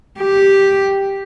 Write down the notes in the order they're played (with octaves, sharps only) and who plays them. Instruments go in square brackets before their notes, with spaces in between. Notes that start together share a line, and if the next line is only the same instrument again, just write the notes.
[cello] G4